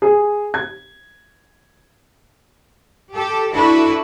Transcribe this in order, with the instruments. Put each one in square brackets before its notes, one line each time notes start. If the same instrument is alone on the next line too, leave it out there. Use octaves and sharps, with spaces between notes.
[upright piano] G#4
G#6
[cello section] G4 A4
D4 E4 F#4 A4 B4